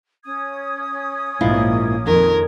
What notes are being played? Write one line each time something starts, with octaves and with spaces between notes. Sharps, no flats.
C#4 D#6 G#6
A#1 G#2 A#3 E4 F4
F2 D#3 A#4